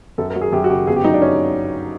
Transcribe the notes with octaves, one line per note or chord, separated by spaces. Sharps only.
F#2 A4
A#4
F#3
G#4
F#2 G4
F#4
C#3 G4
G1 G#4
G4
F#3 D#4
D4
C#4